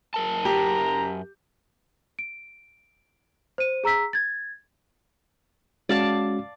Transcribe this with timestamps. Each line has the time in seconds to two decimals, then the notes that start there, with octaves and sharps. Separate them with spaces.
0.14 F#2 A#4 A5
0.45 G4 A#5
2.19 D7
3.58 C5 D#7
3.84 G#4 A#5 E6 B6
4.13 G#6 A6
5.89 G#3 C#4 F#4 D5 F5 A5